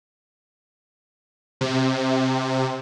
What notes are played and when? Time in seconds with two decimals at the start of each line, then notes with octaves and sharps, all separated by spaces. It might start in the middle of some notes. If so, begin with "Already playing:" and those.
1.61 C3